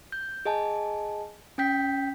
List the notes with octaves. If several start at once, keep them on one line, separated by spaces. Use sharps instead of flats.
G6
G#4 D#5 G#5 A5
C#4 G5 G6 B6